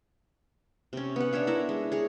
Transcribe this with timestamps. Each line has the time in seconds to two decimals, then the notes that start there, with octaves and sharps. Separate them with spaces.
0.93 C3 C#4
1.16 B3 F#5
1.33 D4 C#5 E5 F5
1.47 E4 A#4 E5
1.69 G#3
1.92 G#4 C#5